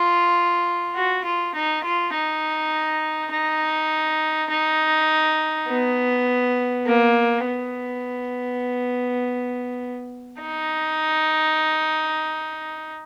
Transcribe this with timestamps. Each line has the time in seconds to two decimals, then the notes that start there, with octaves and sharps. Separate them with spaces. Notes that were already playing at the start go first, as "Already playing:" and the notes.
Already playing: F4
0.96 F#4
1.25 F4
1.55 D#4
1.84 F4
2.13 D#4
3.32 D#4
4.50 D#4
5.68 B3
6.86 A#3
7.46 B3
10.42 D#4